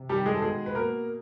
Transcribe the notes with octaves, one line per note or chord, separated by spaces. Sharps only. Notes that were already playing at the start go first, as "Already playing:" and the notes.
Already playing: C3
D#3 G3 G4
G#3 G#4
A4
B2 G#3 G#4
B4
B2 A#3 A#4